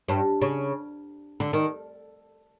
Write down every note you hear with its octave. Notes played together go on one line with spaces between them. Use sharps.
G2
C#3
D3
D#3